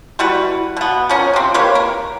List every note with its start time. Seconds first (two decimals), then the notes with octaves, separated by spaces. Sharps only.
0.19 G3 E4 F#4 B4
0.76 B2 B3
1.09 F3 C#4 A#4
1.33 C3 C4
1.54 A#3 G4 B4 C#5
1.75 A#4